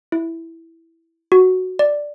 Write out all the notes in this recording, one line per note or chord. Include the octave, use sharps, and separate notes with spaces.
E4
F#4
D5